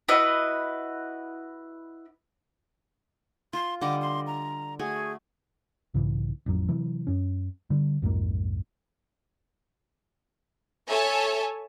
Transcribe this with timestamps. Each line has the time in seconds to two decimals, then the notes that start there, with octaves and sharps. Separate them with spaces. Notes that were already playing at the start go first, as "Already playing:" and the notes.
0.08 E4 F#4 B4 D#5
3.53 F4 C6
3.81 D3 G3 D#5 D6
4.02 C6
4.27 A#5
4.79 A3 F#4 G#4 G#5
5.94 B1 G#2 C#3 E3
6.46 A1 F2 F#3
6.68 C3 E3 F#3
7.07 F#2 C#4
7.70 D3 G3
8.02 B1 F2 G#2 A#3
10.89 A4 C#5 E5 G#5 A5